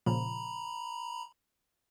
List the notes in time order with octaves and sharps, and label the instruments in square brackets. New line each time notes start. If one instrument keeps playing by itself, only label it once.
[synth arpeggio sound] A#2 C#3 F3 [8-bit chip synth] A#5 B5